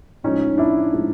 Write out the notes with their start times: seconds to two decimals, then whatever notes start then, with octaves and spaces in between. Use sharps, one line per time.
0.23 A2 F3 G#3 C#4 D#4
0.58 D4 E4
0.92 A2 F3 G#3